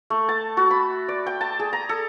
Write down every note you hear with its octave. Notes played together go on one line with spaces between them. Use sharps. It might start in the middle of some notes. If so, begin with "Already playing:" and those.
A3
A5
F#4
B5
D5
G5
A5
G#4
A#5
A4